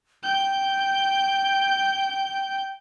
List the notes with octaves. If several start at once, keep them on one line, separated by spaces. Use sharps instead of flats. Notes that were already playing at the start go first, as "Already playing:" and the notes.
G5 G6